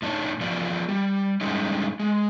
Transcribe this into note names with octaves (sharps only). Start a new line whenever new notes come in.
A2 D4 D#4 C#5
F3 B3 F4 F#4 D5
G3
D3 G3 G#3 C#4 D#4
G#3